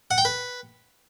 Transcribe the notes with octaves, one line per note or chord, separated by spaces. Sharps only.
F#5
G5
B4